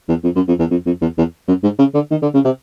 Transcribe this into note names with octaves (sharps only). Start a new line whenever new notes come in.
E2
F2
F#2
F2
E2
F2
F2
E2
E2
F#2
G#2
C#3
D3
D#3
D3
C#3
C3